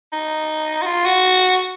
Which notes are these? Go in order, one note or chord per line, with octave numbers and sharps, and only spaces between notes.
D#4
F#4
F4
F#4